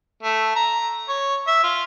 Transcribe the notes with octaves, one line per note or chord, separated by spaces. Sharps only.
A3
A#5
C#5
E5
F4